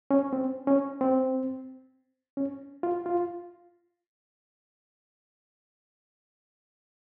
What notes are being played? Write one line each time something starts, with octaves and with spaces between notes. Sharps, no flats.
C#4
C4
C#4
C4
C#4
F4
F4